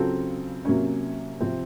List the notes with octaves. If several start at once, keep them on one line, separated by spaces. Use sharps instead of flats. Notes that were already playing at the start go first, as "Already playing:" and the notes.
Already playing: C#3 F#3 C4 F4 A4
C3 F#3 A#3 C#4
C3 F3 C4